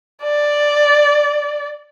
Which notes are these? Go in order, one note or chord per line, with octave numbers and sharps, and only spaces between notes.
D5